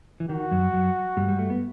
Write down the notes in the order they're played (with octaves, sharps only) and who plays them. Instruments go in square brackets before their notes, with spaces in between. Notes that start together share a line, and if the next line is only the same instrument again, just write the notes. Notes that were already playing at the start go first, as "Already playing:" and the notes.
[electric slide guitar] E3
[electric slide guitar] D#3 [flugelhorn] F#4
[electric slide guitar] F#2 F#3
F#2 F#3
G2 G3
G3
A3
B3